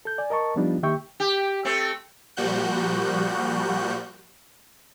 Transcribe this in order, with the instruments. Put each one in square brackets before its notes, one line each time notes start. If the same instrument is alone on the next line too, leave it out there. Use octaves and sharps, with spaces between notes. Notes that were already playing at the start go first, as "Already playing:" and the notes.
[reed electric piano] A4 G6
D5 G#5
A#4 D#5 A5 C#6
F3 G3 B3 D4 D#4 F4
D#3 A#3 G4 E5 G5 C#6
[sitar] G4
A3 C4
[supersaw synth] A#2 F3 G3 F#4 F#6 G6